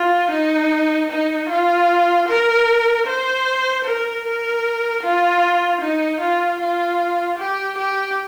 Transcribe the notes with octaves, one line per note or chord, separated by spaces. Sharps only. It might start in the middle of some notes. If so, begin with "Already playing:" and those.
Already playing: F4
D#4
D#4
F4
A#4
C5
A#4
A#4
F4
D#4
F4
F4
G4
G4